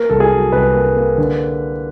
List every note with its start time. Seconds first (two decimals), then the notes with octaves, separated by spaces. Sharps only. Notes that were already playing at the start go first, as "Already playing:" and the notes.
Already playing: A#3 A#4
0.10 C2 A4
0.20 G#4
0.32 F#3
0.53 C2 B4
0.74 A#3
0.97 A#3
1.18 D3